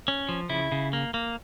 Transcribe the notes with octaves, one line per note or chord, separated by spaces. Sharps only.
C#4
F3
C#3 E4
C#3
A#3
A#3